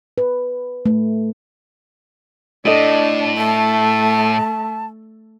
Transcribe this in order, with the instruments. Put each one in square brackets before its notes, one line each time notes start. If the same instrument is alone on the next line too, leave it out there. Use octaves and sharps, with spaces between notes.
[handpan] B4
A3
[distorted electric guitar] A2 [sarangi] D4 [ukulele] A4 D#5
[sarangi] A3 [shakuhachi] A5